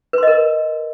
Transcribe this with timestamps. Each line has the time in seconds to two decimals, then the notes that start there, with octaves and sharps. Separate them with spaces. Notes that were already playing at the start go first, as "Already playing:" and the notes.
0.13 B4
0.18 C6
0.23 D#5
0.27 A#4